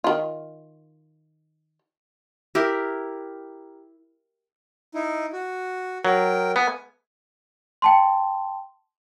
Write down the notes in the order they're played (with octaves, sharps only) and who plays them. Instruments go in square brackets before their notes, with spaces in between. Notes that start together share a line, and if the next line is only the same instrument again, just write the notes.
[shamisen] D#3 F4
[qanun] E4 G4 A#4
[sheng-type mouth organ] D#4 E4
F#4
[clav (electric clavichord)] F#3 [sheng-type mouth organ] A#4 G5
[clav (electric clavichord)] B3 [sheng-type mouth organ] G#5
[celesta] G5 A5 C6